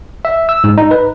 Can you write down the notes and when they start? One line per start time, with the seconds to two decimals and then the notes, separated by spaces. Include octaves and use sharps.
0.25 E5
0.49 E6
0.64 G#2
0.78 D#4
0.91 B4